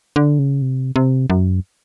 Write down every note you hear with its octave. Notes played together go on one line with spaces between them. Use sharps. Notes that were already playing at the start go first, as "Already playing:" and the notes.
D3
C#3
C3
C3
F#2